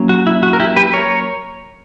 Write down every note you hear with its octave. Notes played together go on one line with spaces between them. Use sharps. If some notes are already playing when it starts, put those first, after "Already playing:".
Already playing: F#3 A#3 C#4
F#4
E4
F#4
A#4
E4 G4
G4 B4
A#4 C#5